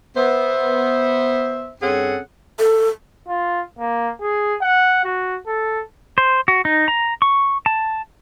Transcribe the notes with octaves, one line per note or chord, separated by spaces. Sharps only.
B3 C5 E5
G2 C4 C#4 G#4 A4 F#5
A4
F4
A#3
G#4
F#5
F#4
A4
C5
F#4
D#4
A#5
C#6
A5